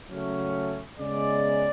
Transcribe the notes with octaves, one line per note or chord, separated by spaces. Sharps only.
C#3 F#3 A3 C#4
C#3 G#3 B3 D5